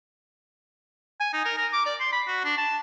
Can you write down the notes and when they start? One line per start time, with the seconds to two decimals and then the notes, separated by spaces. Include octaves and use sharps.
1.20 G#5
1.34 D#4
1.45 A#4
1.57 A#4
1.73 D6
1.86 D5
2.00 C6
2.13 B5
2.28 F#4
2.44 D4
2.58 A5